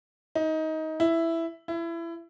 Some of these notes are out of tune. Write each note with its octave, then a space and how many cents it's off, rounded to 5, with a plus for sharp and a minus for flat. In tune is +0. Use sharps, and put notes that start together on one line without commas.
D#4 +20
E4 +5
E4 +25